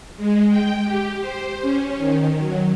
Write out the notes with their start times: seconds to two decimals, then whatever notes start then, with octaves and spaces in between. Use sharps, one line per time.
0.17 G#3
0.50 G5
0.85 G4
1.20 C5
1.62 C#4
1.98 D#3
2.39 F#3